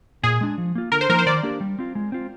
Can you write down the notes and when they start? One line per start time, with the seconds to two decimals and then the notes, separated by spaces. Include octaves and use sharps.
0.23 A#2 G#4
0.41 G#3 D4
0.58 F3
0.75 A#3 F4
0.92 D3 A#4
1.01 C5
1.09 F3 A#3 D#4 A#4
1.19 C5
1.26 D#3 D5
1.43 A#3 D4 G4 A#4
1.60 G3
1.79 C4 F4
1.95 G#3
2.12 C4 F4